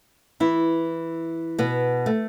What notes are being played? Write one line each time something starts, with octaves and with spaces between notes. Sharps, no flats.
E3 E4
B2 B3
A3